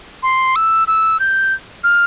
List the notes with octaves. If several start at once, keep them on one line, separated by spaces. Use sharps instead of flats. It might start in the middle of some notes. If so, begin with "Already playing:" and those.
C6
E6
E6
G6
F6